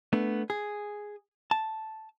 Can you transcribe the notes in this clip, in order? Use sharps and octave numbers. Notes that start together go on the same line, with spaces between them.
A3 B3 D4
G#4
A5